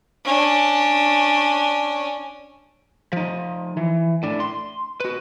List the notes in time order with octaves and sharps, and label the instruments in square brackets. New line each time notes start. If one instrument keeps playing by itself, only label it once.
[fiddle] C#4 D4
[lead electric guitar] F3 D#4
E3
A2 D4
C6
F#4 B4